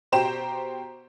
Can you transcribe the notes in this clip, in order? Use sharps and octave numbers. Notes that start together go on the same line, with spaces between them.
B2 G4 C5 G5 A#5 E7